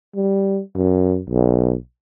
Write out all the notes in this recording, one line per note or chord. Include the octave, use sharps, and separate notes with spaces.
G3
F#2
B1